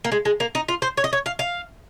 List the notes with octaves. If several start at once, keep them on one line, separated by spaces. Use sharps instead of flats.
A#3
G#3
G#3
A#3
D#4
F4
C5
C#5
D#5
C#5
F5
F5